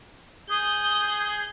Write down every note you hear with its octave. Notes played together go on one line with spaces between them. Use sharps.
G#4 D#6 G6